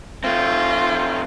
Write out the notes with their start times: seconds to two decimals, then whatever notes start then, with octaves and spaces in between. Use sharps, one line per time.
0.24 A3 C4 F4